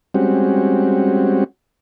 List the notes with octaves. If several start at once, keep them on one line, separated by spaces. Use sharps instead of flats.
G3 G#3 C4 C#4 F#4